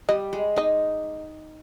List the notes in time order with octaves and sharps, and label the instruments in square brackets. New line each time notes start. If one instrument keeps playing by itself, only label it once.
[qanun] G3 [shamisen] D#5
[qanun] G#3
[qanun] D#4 [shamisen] D#5